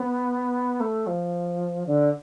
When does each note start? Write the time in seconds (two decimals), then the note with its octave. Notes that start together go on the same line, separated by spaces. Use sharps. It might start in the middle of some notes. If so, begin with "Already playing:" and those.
Already playing: B3
0.80 A3
1.07 F3
1.86 D3